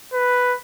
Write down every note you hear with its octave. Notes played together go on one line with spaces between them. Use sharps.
B4